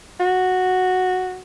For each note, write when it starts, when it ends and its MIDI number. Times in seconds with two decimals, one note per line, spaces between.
0.20 1.41 66